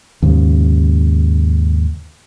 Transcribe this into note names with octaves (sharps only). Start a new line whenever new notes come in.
D#2 G#2 C#3